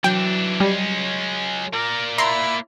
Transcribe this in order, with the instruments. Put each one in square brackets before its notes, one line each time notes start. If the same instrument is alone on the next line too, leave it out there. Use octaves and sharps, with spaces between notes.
[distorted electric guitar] E3 D4 [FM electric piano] F#3 [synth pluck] G5
[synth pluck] G3 [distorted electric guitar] G#3 C#4
[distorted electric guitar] A#3 D5 [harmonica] A#4
[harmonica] E4 [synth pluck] A#5 C6